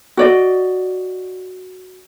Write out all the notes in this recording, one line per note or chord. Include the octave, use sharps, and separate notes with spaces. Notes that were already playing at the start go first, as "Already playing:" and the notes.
F#4 D5 D#5